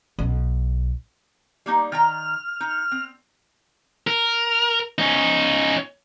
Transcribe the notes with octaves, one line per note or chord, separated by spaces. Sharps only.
B1
G3 A#3 D#4
D#3 G5 A#5 F6
D#4
C4
A#4
C#4 D#4